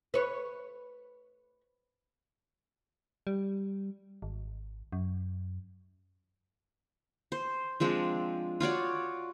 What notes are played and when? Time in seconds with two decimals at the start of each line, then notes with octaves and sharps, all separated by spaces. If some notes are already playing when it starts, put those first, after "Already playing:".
0.14 B4 C#5
3.27 G3
4.22 G#1
4.92 F#2
7.32 C5
7.80 F3 G#3 C4 D4
8.60 F4 F#4 C#5 D5